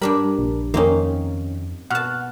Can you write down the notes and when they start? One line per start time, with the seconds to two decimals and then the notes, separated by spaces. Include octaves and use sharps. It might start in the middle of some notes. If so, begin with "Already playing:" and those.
0.02 G2 G3 D4 A#4 B5
0.39 A#1
0.74 F2 D#3 A#3 C4 C#4 D#4
1.90 B2 F#5 A5 F6 F#6